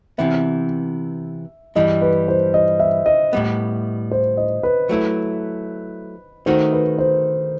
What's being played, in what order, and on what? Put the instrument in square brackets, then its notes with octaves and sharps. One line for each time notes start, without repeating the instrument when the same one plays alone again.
[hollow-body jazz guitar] C3 E3 B3 [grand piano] E5
[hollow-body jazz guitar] G2 E3 G3 [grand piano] D#5
[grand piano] B4
C5
D#5
E5
D#5
[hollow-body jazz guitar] A2 G3 B3
[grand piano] C5
D#5
B4
[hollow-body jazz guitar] F#3 A3 E4
[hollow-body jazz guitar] D#3 A3 D#4 F#4 [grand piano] C5
[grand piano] B4
C5